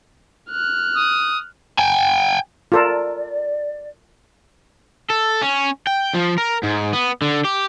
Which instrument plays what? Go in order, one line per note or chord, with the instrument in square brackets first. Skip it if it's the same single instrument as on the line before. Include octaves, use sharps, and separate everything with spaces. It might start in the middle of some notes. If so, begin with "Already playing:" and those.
[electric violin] F6 F#6
[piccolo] D#6
[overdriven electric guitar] G5 G#5
[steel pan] F4 A4 A#4 [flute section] D5
[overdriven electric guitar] A4
C#4
G5
F3
A#4
G#2
B3
D3
G4